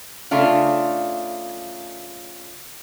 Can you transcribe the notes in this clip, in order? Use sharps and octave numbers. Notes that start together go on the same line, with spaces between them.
C#3 A3 D4 F4